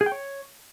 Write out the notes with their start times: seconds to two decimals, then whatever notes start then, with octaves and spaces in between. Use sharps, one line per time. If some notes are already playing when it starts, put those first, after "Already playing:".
0.01 G#4
0.06 G5
0.12 C#5